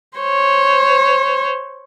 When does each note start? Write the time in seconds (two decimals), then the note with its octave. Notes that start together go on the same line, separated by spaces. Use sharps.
0.18 C5 C#5